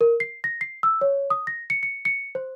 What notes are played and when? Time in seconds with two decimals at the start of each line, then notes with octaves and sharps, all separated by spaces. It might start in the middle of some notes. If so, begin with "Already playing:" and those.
0.01 A#4
0.20 C7
0.44 A#6
0.61 C7
0.83 E6
1.01 C#5
1.30 D#6
1.47 A#6
1.70 C#7
1.83 C#7
2.05 C#7
2.35 C5